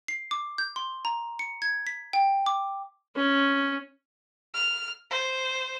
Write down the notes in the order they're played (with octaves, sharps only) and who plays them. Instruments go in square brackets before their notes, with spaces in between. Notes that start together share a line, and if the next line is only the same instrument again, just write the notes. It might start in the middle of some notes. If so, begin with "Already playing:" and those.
[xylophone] C7
D6
G6
C6
A#5
C#7
G#6
B6
G5
D6
[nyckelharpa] C#4
[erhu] F6
C5